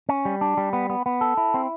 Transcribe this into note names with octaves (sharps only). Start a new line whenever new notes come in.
C#4
G3
D4
G3
B3
B3
B3
A4
E4
C4